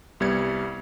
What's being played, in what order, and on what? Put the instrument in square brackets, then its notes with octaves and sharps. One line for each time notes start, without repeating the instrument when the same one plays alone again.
[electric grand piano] C2 G3 B3 G#6 C#7